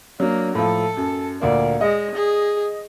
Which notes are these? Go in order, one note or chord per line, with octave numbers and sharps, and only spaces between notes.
F#3 A#3 D4
A2 F3 A4
F#2
D2 A#2 A#3 D5
G#3 D#5
G#4